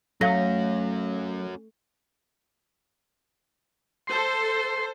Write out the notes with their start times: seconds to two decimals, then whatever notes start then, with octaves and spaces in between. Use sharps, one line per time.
0.21 F#3 A3 C#4 F#4 F5 A#6
4.07 A4 C5 C6